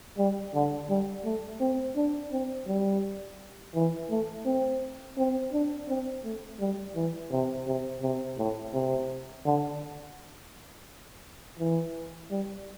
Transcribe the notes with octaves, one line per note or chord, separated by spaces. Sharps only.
G3
D3
G3
A3
C4
D4
C4
G3
E3
A3
C4
C4
D4
C4
A3
G3
E3
C3
C3
C3
A2
C3
D3
E3
G3